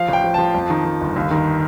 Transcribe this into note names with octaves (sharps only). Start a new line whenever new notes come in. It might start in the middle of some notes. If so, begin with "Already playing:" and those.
Already playing: F3 F5
A1 G5
F3
F3 A5
F2
D#3
D#3
G1
D#2
D#3